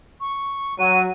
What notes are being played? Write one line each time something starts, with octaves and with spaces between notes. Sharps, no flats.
C#6
F#3 D#7